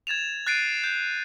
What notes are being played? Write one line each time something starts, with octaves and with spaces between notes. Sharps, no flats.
G#6 A6 E7 F7
F#6 A6 C7 D7 D#7
G6